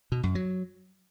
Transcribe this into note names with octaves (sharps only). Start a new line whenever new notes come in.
B2
F#2
F#3